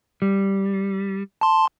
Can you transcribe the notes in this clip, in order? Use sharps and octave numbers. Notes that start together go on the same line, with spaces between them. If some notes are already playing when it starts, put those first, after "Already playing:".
G3
A5 C6